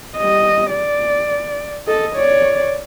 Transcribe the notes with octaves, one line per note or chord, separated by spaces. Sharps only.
G3 D#5
D5
A4 D#5
C#5 D5